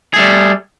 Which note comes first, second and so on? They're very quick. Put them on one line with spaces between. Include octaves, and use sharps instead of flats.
G#4 A3 G3